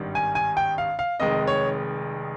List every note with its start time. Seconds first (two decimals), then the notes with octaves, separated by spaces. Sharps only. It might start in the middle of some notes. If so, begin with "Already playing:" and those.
Already playing: G#1 G2 D#3 G3
0.15 G#5
0.35 G#5
0.57 G5
0.78 F5
0.99 F5
1.20 F1 F2 D#3 G#3 D#5
1.47 C#5